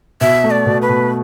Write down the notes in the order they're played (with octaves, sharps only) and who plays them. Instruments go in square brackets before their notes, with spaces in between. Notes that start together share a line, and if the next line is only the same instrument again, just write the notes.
[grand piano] B2 [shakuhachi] E5
[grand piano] A3
[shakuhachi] D5
[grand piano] B2
[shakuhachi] B4
[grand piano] B2